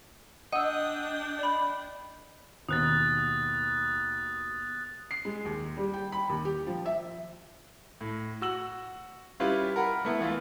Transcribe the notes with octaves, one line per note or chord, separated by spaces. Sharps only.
D4 D#5 F#5 G5 E6
D5 B5
D#2 B2 D#6 F#6 A6
C7
G#3
D#2
G3
G5
B5
D#2
G4
F3
E5
A2
F#4 E6 F#7
G3 C#4 E4 F4 G4 B4
A#4 F#5 B5
A3 B3 E4
E3 A3 F4